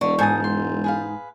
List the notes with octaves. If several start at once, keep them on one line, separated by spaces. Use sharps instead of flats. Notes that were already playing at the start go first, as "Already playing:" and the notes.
E1 D3 D5 C#6
G#2 A4 G#5 D#6 G6 A6
C6
G#4 B4 F5